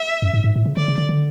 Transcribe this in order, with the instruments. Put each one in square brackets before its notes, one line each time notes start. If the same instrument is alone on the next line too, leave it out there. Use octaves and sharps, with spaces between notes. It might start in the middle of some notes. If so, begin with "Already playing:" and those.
Already playing: [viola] E5
[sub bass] F#2
G#2
G#2
A2
C#3
[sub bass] D3 [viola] D5
[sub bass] C#3
D3
D3